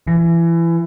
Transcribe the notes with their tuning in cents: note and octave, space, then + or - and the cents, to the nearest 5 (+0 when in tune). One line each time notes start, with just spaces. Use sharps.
E3 +25